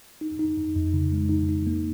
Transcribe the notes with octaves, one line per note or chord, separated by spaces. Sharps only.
D#4
D#4
F2
F2
C#3
G#3
D#4
D#4
A#3